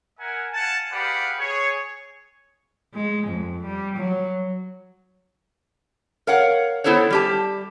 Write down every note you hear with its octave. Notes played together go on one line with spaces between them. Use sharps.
A#4 E5 F#5 G#5
F5 F#5 G#5 A5
G4 G#4 B4 D5 F5 F#5
G#4 C#5
G#3
F2
G3
F#3
A#4 C#5 F5 F#5
B3 E4 A4 C5 C#5
G3 G4 A5